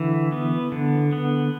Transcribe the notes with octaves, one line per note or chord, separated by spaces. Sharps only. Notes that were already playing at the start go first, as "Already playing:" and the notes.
Already playing: D3 E3 E4
B3
D3
B3